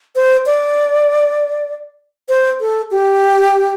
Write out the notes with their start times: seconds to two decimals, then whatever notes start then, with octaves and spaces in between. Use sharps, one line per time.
0.16 C5
0.46 D5
2.29 C5
2.60 A4
2.91 G4